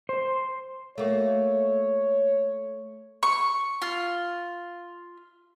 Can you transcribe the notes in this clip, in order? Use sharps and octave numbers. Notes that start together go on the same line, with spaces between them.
C5
A3 A#3 F#4 C#5
C#6
F4